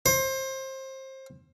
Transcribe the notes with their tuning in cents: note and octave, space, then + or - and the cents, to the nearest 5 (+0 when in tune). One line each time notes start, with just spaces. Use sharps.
C5 +25